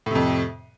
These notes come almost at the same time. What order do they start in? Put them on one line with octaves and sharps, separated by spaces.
A2 C3 F2